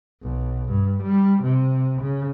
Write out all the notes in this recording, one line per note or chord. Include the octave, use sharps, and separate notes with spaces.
B1
G2
G3
C3
C#3